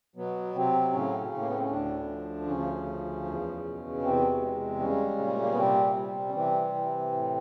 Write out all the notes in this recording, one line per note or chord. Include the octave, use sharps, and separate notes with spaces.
B2 F#3 B3
C3 F#3 C4
A2 C#3 C#4
A2
A#3
B3
C4
C#4
D2 D3 D4
F3
D2 C#3 C#4
F3
E2
B2
E2 C3 C4
G#3
C#3 G3 C#4
A#2
G#3
A3
A#3
B3
C3 G3 C4
G3
C#4
C3 E3 C4
E3
A2